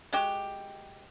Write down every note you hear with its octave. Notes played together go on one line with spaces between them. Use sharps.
G#3 F#4 G4